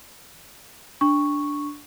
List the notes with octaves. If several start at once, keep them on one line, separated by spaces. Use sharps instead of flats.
D4 C#6